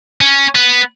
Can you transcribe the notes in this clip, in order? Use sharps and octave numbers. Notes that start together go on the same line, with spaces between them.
C#4
B3